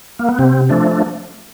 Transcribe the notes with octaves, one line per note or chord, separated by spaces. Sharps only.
A#3
B3
C3 C4
F3 A3 D4
D4